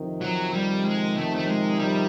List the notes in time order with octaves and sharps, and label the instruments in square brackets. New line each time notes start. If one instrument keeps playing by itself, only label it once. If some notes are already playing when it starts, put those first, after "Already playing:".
Already playing: [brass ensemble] F2 C3 D#3
[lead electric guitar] F#3
G3
G#3
A3
A3
G#3
G3